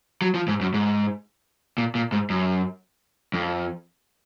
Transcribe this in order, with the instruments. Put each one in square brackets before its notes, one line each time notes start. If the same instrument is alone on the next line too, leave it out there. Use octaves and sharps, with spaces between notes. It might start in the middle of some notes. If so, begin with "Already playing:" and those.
[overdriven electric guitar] F#3
F3
G#2
F#2
G#2
A#2
A#2
G#2
F#2
F2